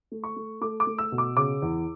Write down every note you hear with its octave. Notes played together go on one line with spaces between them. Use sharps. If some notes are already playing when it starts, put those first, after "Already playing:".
A3
C#6
A3
A3 D6
D6
A3
E6
B2
D6
C#3 D6
E2